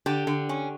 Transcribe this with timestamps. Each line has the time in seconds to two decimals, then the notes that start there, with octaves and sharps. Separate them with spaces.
0.06 D3 G4
0.27 D3
0.49 C#4